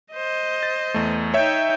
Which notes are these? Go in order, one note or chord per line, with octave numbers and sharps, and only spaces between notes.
C5 D#5
A6
E2 A3
D#4 C#5 E5 G5